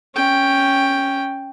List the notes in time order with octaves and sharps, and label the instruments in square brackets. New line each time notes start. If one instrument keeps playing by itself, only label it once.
[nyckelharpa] C#4 G5